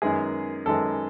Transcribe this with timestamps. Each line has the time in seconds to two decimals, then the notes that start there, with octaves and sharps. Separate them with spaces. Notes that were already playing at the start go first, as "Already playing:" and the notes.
0.02 F#2 D#3 G#3 B3 G#4
0.66 F#2 D#3 G#3 B3 A4